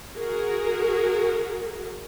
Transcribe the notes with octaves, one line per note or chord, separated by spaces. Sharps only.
F#4 G#4 A#4